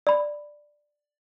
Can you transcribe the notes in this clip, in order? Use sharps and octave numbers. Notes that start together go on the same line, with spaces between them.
D5 B5